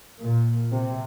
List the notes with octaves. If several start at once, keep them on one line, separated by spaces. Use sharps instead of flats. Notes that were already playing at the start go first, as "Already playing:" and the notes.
A#2
C3